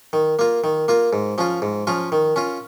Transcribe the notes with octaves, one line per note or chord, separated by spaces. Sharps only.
D#3
A#3 F4
D#3
A#3 F4
G#2
F3 C#4 F4
G#2
F3 C#4 F4
D#3
C#4 F4